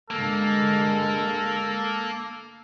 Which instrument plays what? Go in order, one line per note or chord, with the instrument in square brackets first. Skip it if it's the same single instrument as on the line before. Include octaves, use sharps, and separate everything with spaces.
[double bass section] G2 D3 G#3 [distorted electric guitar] A#3 [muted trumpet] A4